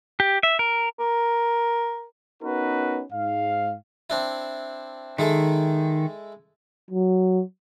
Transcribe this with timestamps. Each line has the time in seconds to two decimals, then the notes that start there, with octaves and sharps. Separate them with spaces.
0.20 G4
0.43 E5
0.59 A#4
1.00 A#4
2.43 B3 C#4 D#4 F#4 A#4 B4
3.13 G#2 F5
4.10 C4 D4 E4
5.19 D#3 G#3 E4 A4
6.91 F#3